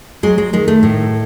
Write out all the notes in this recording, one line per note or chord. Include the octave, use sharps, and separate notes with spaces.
F#3 G#3
G#3
D#3 G#3
A3
A2